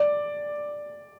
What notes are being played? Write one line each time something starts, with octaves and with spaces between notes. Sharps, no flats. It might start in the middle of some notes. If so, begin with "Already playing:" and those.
Already playing: D5